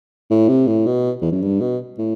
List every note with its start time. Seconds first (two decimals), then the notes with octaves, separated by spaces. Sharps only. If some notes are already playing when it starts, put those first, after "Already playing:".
0.30 A2
0.48 C3
0.67 A2
0.86 B2
1.21 E2
1.32 F#2
1.42 G2
1.61 B2
1.98 A2